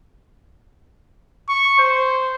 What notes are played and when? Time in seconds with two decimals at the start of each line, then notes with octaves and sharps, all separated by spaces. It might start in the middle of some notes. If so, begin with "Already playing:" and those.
1.49 C#6
1.79 C5